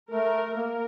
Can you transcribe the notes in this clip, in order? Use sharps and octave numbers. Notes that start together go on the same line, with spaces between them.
A3 A#4
A#3 A#4